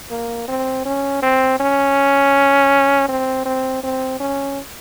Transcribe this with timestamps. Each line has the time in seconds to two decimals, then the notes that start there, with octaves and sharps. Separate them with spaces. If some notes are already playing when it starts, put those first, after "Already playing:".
0.11 A#3
0.48 C4
0.85 C#4
1.22 C4
1.60 C#4
3.09 C4
3.46 C4
3.83 C4
4.20 C#4